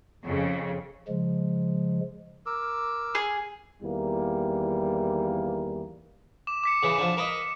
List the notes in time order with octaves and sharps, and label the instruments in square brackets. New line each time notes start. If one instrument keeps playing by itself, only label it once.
[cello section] F2 C#3
[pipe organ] C#3 F3 G#3
[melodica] A#4 D6 E6
[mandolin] G#4
[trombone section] E2 D#3 E3 G3 A#3
[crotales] D6 E7
D6 B6 C#7
[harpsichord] C#3 E3
D3 F3
A#4 B4 D#5